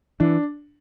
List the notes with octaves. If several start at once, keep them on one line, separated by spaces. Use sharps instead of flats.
E3 D4